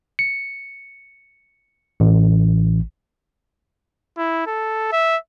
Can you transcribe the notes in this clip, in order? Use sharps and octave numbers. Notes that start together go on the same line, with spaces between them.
C#7
A1
E4
A4
E5